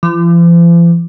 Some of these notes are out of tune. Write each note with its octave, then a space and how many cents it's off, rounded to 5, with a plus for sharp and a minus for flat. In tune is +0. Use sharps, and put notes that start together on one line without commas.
F3 -45